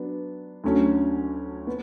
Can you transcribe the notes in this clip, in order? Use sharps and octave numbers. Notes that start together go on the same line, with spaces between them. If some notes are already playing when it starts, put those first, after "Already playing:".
Already playing: F#3 B3 D4
D2 D3 F#3 A3 C#4
B3